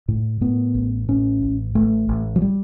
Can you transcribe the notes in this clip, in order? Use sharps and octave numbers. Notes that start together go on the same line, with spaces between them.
A2
A2 B3
A1
A2 C#4
A1
A1 A3
A1
F#3
G3